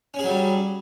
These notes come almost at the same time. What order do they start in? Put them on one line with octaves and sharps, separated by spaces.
C#4 G#4 F#3 G3